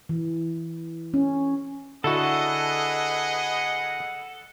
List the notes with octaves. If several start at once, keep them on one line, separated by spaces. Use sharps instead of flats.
E3
C#4
D3 E4 F#4 G#4 A4 B4 D#5 F#5